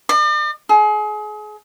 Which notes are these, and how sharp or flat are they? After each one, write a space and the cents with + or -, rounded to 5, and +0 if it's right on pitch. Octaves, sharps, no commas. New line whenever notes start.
D5 +45
G#4 +30